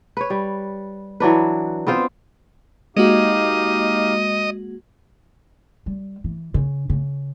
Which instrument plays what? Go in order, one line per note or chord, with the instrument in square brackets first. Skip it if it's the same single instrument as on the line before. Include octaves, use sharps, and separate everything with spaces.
[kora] B4 C#5
G3
E3 F#3 D4 B4
B3 C4 F4 C5
[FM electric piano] G#3 A#3 F#4 [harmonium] D#4 G4 F5 [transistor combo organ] D#5
[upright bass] G3
E3
C#3
C#3